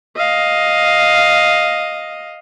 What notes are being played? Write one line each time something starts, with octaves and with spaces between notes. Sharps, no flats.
D#5 F5